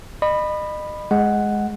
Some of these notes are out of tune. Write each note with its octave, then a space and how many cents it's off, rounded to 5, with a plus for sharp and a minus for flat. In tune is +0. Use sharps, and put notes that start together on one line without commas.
D#5 -35 B5 +0
G#3 +0 F#5 +0